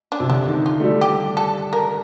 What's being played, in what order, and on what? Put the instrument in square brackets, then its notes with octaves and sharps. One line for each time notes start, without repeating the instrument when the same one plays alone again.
[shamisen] D4
[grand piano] C3
[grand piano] D3 [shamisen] D4
[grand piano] D#3
[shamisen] F4
[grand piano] A3
G3
[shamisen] G4
A4
A#4